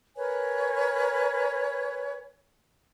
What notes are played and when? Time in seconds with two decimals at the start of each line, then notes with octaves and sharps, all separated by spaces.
0.16 A#4 B4 C#5 G#5